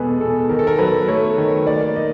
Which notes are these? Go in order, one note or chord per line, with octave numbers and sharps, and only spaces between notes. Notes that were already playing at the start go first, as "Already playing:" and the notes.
Already playing: E2 B2 G#3 G#4 A4 B4
B2 A4
D#3 A#4
A4
A#4
F#3 B4
A3 C#5
D#3
A#3 D5
A#3 D#5